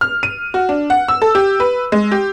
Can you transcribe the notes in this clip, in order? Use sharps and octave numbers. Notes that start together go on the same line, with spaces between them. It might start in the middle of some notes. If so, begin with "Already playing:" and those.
F6
D#7
F#4
D4
F#5
E6
A4
G4
B4
G#3
G4